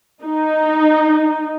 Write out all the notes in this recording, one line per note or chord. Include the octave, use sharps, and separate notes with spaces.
D#4